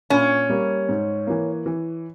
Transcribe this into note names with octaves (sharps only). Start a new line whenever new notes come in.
A#2 C#4
G3 A#3
G#2
E3 A#3
E3